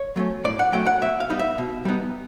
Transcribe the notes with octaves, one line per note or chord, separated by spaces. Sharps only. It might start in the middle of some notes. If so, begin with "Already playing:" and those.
Already playing: C#5
F#3 A3 C#4
A2 D5
F#5
F#3 A3 C#4 G5
F#5
B2 E5
F5
G3 B3 D#4
E5
B2
G3 B3 D#4